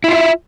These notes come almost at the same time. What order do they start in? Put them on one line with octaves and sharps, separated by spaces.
E4 F4 E5